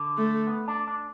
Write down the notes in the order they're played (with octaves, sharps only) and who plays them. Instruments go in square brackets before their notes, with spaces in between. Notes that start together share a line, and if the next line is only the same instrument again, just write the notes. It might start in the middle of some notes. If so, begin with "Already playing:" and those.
Already playing: [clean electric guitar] D3
[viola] A3
[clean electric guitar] B3
D4
D4